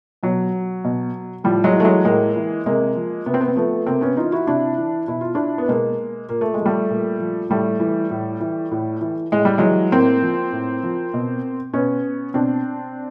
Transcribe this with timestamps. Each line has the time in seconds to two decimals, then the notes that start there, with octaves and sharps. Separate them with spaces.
0.23 B2 F#3
0.84 B2
1.44 A2 F3 G3
1.64 F#3 G#3
1.75 E3 A3
1.84 F#3 G#3
2.05 A2 G#3 A#3
2.36 E3
2.66 C3 G#3 A#3
2.96 F3
3.26 C3 B3
3.34 C4
3.41 B3
3.48 C4
3.56 F3 A3 B3
3.86 C3 A#3 C4
4.01 B3 C#4
4.17 E3 D#4 F4
4.32 E4 F#4
4.47 C3 D4 E4
4.78 E3
5.08 B2 E4
5.21 F4
5.35 D4 E4
5.58 B3
5.68 B2 G#3 A#3
6.29 A#2 A#3
6.41 A3
6.54 G#3
6.59 F3
6.66 G3 A3
6.90 A#2
7.20 F3
7.49 A2 G3 A3
7.80 E3
8.11 A2
8.40 E3
8.71 A2
9.01 E3
9.32 A2 G#3
9.45 G3
9.58 E3 F#3 G#3
9.92 A2 A#3 C4
10.22 F3
10.52 A2
10.83 F3
11.14 B2
11.73 B2 B3 C#4
12.34 B2 C4 D4